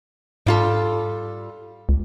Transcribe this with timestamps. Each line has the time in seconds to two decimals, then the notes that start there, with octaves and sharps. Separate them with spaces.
0.47 G#2 G3 F4 A4
1.89 C#2